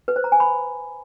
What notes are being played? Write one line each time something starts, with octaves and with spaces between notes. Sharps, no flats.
B4
C5
A#5
G#5
B5